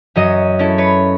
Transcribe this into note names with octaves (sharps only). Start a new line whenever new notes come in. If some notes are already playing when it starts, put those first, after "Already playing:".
F#2 F#3 D#5 D#6
C#4 E4 A4
B4 C#5